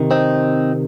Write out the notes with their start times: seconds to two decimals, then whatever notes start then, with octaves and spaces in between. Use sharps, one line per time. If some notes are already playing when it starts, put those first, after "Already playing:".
Already playing: C3 D#3
0.11 C4 D#4